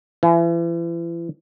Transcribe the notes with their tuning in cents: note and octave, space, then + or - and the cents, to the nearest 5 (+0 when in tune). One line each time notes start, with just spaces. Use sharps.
E3 +35